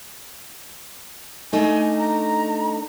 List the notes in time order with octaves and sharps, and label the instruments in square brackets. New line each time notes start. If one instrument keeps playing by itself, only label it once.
[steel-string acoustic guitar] A3 D4 D#4 [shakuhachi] G#5
[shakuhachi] A#5